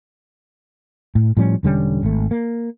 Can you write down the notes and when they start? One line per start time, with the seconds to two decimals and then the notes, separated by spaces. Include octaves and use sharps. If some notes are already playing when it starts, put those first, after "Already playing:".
1.15 A2
1.37 A2 F3 G3 C#4
1.63 E1 D3 G3 C#4
2.03 G#1 A3
2.31 A#3